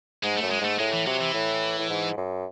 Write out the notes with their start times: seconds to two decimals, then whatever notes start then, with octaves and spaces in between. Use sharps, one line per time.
0.23 G#2 G#3
0.38 F#2 A3
0.51 G#3
0.61 G#2 A3
0.79 A2 G#3
0.93 E3
1.07 C3 F#3
1.21 E3
1.34 A2
1.79 A2
1.90 G#2
2.17 F#2